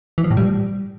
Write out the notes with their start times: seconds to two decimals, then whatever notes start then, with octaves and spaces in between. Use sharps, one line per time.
0.18 E3
0.24 F3
0.31 A2
0.37 G3